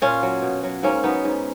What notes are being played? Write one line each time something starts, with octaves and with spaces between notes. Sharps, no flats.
A#2 C#4 F4
F#3
B2
F#3
G#2 A#3 C#4
F#3 B3 D#4
G#2